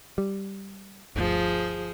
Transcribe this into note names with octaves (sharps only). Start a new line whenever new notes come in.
G3
G1 D2 F3 G#4